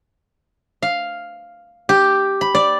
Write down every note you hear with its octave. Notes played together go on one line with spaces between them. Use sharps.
F5
G4
B5
D5